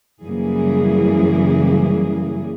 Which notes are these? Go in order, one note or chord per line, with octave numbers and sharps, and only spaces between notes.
F#2 C#3 E3 G3 A#3 G#4